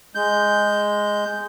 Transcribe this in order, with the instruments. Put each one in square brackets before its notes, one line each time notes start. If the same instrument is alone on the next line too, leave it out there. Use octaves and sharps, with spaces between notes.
[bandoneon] G#3 G6